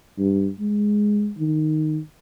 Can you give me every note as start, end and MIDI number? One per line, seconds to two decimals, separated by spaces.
0.18 0.49 43
0.60 1.31 56
1.38 1.99 51